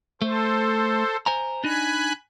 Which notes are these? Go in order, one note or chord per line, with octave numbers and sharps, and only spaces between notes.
A3 A4 C5
C5 G#5 A#5
D4 D#4 G#5 B5 F#6